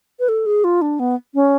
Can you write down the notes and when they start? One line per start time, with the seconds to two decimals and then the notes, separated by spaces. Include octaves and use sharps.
0.20 B4
0.29 A4
0.46 G#4
0.64 F4
0.82 D4
0.99 B3
1.35 C#4